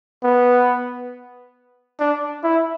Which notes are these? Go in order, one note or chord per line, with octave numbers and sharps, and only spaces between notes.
B3
D4
E4